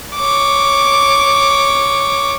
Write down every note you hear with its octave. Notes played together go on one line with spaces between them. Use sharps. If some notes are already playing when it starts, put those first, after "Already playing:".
C#5 D6